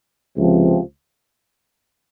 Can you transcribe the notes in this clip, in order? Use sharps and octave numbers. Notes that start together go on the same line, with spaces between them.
C#2 C3 F3 C4